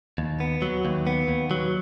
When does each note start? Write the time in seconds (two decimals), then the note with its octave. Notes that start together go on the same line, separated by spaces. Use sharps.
0.18 D#2
0.40 B3
0.62 F#3
0.85 D#2
1.07 B3
1.28 D#2
1.51 F#3